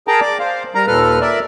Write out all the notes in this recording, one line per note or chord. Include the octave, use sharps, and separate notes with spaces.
G#4 A#4 G5 A5 A#5
D5 D6
C5 F5
G3 A#4 A#5
D#2 A#2 A4 B4 F6
A#4 D5 E5